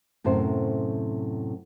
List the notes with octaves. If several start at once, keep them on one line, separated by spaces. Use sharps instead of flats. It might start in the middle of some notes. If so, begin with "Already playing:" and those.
F#2 A2 C3 C5